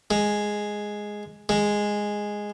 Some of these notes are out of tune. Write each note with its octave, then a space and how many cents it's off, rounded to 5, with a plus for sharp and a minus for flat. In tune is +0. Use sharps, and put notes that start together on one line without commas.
G#3 +0
G#3 -5